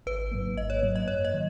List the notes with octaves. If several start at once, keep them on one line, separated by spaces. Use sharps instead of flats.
G#1 B4
G#2 F#3 A#3
G#1 D#5
C#5
G#2 F#3 A#3
D#5
F#2 C#5
D#5
D#3 F#3